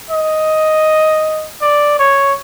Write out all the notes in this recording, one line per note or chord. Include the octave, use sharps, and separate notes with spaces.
D#5
D5
C#5